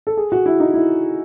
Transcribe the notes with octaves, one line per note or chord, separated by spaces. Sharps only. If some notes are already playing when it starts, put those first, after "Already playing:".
A4
G#4
F#4
E4
D#4
E4